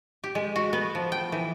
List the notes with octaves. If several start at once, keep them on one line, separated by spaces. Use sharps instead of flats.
G4
G#3
F#4
B3
F3
G5
E3